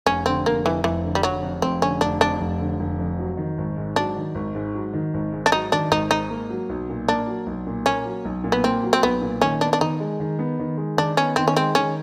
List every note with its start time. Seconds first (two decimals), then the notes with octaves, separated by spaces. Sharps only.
0.06 F1 C#4
0.26 D3 C4
0.46 F1 A#3
0.65 F2 E3
0.84 F1 E3
1.04 D3
1.15 G3
1.23 F1 F#3
1.43 F2
1.62 F1 C4
1.82 D3 C#4
2.01 F1 D4
2.21 F2 D4
2.41 F1
2.59 D3
2.80 F1
2.98 F2
3.19 F#3
3.37 D#3
3.58 G#1
3.77 G#2
3.96 F#3 D4
4.16 D#3
4.35 G#1
4.55 G#2
4.74 F#3
4.93 D#3
5.14 G#1
5.32 G#2
5.46 D4
5.52 F#3 D#4
5.72 D#3 D4
5.91 G#1 D#4
6.11 G#2 D#4
6.30 A#3
6.50 F#3
6.69 B1
6.89 A#2
7.08 A#3 D4
7.27 F#3
7.46 B1
7.67 A#2
7.85 A#3 C#4
8.05 F#3
8.25 B1
8.44 A#2
8.52 B3
8.64 A#3 C4
8.83 F#3
8.93 C4
9.03 B1 B3
9.22 A#2
9.41 D#3 C#4
9.61 B3 D4
9.73 D4
9.81 D#3 D#4
10.00 G#3
10.20 D#3
10.39 B3
10.59 D#3
10.78 G#3
10.97 D#3 D4
11.17 B3 C#4
11.36 D#3 C4
11.48 C#4
11.56 G#3 C4
11.75 D#3 C#4